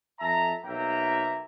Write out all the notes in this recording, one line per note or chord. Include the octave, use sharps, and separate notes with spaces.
F2 E5 A5 A#5
B1 A#3 E5 G5 A#5